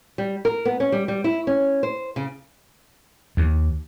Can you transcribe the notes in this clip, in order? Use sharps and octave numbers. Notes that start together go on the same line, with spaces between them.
G3
A#4
B3
C#4
G3
G3
E4
C#4
C5
C#3
D#2